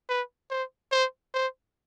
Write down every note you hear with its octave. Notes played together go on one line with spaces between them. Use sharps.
B4
C5
C5
C5